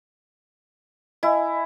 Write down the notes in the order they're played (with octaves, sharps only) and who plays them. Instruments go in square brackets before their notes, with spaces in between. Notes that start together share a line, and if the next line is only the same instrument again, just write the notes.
[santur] E4 [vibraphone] D#5 G#5